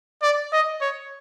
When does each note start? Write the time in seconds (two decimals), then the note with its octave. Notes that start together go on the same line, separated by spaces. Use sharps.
0.22 D5
0.53 D#5
0.81 C#5